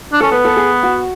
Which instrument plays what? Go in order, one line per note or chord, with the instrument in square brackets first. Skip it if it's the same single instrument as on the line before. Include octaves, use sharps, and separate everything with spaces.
[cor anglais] D4
[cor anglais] C#4 [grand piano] A4
[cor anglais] B3 [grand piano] B4
[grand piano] A4
G#4
F#4